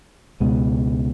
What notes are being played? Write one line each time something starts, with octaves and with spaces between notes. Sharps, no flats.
C#2 B2 G#3